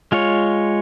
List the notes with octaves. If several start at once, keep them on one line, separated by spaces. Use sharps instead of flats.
G#3 F4 C#5